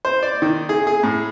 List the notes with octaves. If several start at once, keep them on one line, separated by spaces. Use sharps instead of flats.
C5
D5
D#3
G#4
G#4
A2